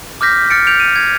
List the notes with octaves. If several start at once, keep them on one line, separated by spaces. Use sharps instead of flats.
D6 F6 G6 A#6 B6
F6 A6 C#7 D7
G6 D7 F7
D#7
G#6